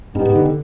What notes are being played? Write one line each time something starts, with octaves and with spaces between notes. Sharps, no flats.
G2 B3 D#4 G4
G#2
D3
D3